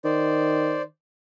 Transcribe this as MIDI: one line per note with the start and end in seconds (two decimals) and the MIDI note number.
0.04 0.84 51
0.04 0.82 72
0.04 0.82 74